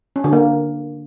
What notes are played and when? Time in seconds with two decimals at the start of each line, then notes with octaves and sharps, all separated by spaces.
0.16 C#4
0.24 D3
0.33 A#3